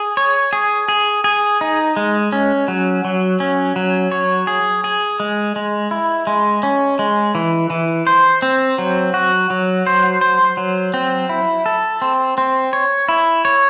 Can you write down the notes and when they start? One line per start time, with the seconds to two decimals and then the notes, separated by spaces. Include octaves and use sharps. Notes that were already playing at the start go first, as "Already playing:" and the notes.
Already playing: G#4
0.17 C#5
0.53 G#4
0.88 G#4
1.24 G#4
1.61 D#4
1.96 G#3
2.32 C#4
2.68 F#3
3.05 F#3
3.40 C#4
3.76 F#3
4.12 C#5
4.47 G#4
4.84 G#4
5.20 G#3
5.56 G#3
5.91 E4
6.27 G#3
6.63 C#4
6.99 G#3
7.35 E3
7.70 E3
8.07 C5
8.42 C4
8.78 F#3
9.14 F#4
9.50 F#3
9.87 C5
10.21 C5
10.57 F#3
10.94 C4
11.29 E4
11.66 A4
12.02 C4
12.38 C4
12.73 C#5
13.09 E4
13.45 C#5